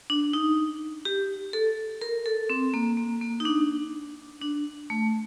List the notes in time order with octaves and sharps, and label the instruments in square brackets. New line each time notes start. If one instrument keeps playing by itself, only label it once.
[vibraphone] D4
D#4
G4
A4
A#4
A4
C4
A#3
A#3
A#3
D#4
D4
D4
A3